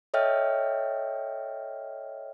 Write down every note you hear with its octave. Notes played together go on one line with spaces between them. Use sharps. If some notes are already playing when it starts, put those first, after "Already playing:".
A4 C#5 D#5 E5 G5 F6